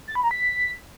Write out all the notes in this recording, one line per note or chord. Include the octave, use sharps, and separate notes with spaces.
A6
B5
A#5
B6